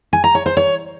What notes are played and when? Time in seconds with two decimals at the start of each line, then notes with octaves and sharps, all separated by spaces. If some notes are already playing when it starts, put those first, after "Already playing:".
0.13 G#5
0.24 A#5
0.35 C#5
0.46 C5
0.57 C#5